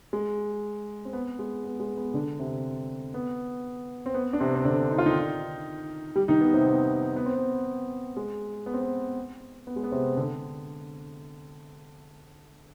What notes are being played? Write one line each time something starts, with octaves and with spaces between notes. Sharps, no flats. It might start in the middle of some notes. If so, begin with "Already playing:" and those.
G#3
C4
B3
G#3
B3
G#3
B3
D3 D4
C3 C4
B3
C4
B3
D4
C3 C4
C4
D3 D4
D#4
F4
D#3 D#4
G3 G4
D#3 D#4
B3
C3 C4
B3
B3
C4
B3
G#3
B3
C4
B3
B3
G#3
B3
C3 C4
D3 D4